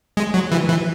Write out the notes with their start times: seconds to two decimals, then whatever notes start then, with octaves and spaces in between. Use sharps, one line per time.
0.17 G#3
0.34 F#3
0.52 E3
0.69 E3